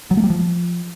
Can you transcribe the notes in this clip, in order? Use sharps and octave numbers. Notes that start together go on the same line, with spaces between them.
F#3
A3
G3
F3